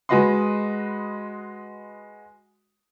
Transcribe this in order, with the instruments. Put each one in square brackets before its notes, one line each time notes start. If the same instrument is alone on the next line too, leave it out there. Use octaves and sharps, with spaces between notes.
[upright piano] G#3 F#4 B4 D#5 C6